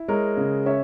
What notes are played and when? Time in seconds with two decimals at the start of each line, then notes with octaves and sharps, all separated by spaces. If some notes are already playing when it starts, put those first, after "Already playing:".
Already playing: E4
0.08 G#3 A#4 C#5
0.37 C#3
0.66 C#4 C#5 E5